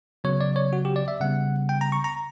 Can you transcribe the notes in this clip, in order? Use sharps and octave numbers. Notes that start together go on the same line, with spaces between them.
C#3 F#3 B3 C#5
D5
C#5
F#4
G4
D5
E5
C#3 G3 B3 F#5
G5
A#5
C#6
A#5